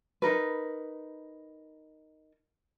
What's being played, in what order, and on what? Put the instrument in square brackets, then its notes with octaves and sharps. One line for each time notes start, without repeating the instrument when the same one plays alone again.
[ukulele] D#4 A#4 B4